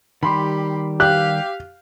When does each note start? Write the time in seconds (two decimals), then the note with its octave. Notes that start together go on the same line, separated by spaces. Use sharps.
0.23 D#3 G3 G4 B5 C6
1.00 G4 F5 F#6